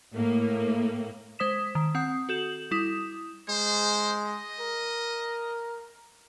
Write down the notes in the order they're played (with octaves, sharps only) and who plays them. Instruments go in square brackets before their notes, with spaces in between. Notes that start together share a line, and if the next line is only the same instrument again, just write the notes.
[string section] A2 A#3
[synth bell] G#3 C5 D#6 B6 E7
D#3
C4 F#5 D#6
F#4 A4 G6 E7 F#7
G3 E4 D#6 E7
[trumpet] G#3 [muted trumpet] C5
[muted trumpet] D#5
[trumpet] A#4